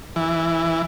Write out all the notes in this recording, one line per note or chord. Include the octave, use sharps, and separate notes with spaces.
E3